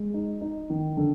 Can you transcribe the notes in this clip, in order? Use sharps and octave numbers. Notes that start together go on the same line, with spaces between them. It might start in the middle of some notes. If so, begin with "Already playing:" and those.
Already playing: G#3
D#4
D#4
D#3
D3